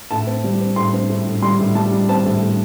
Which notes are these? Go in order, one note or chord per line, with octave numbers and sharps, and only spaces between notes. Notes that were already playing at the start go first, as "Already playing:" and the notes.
A2 A5
C4
G3
C4
A2 C6
C4
A2
A2
G3 C6
A2
G3 A5
G3
C4 A5
A2
A2